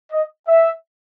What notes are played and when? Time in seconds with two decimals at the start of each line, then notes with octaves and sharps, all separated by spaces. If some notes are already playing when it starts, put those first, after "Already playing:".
0.11 D#5
0.47 E5